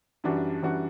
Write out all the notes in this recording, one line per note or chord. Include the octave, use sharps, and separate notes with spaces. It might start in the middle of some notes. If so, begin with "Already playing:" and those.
F#2 E3 G3 D4 F#4
F#2 E3 G3 D4 F#4